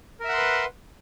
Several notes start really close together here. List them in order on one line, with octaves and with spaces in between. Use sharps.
A#4 E5 F#5 C6 B4